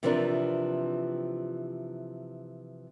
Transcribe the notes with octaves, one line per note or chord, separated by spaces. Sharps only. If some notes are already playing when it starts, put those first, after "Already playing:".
C3 E3 F3 C4 D4 A#4